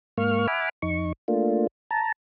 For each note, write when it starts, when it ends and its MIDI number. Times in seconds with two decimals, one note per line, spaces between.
0.17 0.47 44
0.17 0.47 58
0.17 0.47 77
0.17 0.47 85
0.17 0.47 89
0.48 0.69 76
0.48 0.69 78
0.48 0.69 80
0.48 0.69 83
0.48 0.69 86
0.48 0.69 89
0.82 1.12 41
0.82 1.12 63
0.82 1.12 85
1.28 1.67 57
1.28 1.67 58
1.28 1.67 62
1.28 1.67 65
1.91 2.12 81
1.91 2.12 82